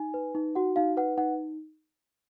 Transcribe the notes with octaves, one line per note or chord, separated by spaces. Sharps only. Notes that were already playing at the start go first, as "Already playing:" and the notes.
Already playing: D#4 G#5
B4
D#4
F#4 F#5
D#4 F5
B4 F#5
D#4 F#5